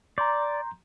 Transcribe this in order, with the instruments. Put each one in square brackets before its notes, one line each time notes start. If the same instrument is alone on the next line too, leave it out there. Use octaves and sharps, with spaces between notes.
[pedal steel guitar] D5 [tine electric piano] A#5 C6 G6